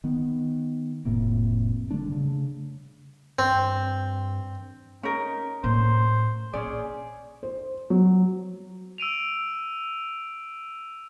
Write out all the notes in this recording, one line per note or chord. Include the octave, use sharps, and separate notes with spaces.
D#3 B3
F1 A2 C3 A#3
D3 G3 A3 D4
C#3
G2 C4
C#4 D#4 A#4
A2 A#3 C5
A#1 C#4 G#4 D5
C5
F#3
E6 D7 D#7 F7